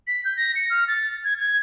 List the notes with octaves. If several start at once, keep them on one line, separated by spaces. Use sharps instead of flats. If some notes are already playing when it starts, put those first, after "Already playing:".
B6
G6
A#6
C#7
F6
A6
G#6
G#6